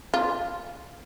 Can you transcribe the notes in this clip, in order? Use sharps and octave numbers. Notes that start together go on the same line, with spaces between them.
F4